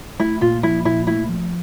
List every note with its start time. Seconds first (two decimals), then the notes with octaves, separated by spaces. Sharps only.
0.20 A3 E4
0.41 A#2 F4
0.63 F3 E4
0.85 A#2 E4
1.07 A3 E4
1.29 F3